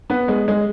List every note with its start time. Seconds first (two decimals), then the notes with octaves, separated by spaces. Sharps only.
0.10 B3
0.28 G#3
0.48 G#3